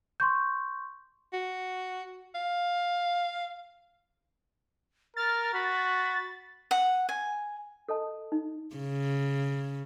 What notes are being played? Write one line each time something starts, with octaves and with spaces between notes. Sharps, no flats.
C6 C#6 G6
F#4
F5
A#4 F6 A6
F#4 B5
F#5
G#5
A4 D#5 A5
D#4
C#3